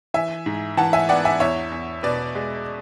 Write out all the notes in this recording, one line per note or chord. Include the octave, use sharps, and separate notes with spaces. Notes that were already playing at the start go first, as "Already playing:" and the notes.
E3 E5 G#5
G#2
E3 F#5 A5
E5 G#5
B3 D5 F#5
E5 G#5
E2 C#5 E5
E2
B2 B4 D5
G#3